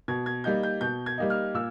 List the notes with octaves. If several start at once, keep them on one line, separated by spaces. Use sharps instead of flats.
B2 G#6
G#6
G3 A#3 D#4 G6
G6
B2 G6
G#6
G3 A#3 D#4
F6
A#2 E6